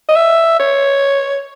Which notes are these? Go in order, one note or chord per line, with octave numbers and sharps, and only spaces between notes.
D#5
E5
C#5